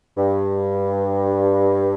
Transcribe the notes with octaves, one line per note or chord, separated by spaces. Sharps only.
G2